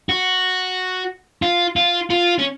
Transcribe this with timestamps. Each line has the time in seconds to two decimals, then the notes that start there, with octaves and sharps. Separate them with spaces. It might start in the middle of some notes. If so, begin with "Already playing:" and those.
0.09 F#4
1.42 F4
1.76 F4
2.10 F4
2.39 C#4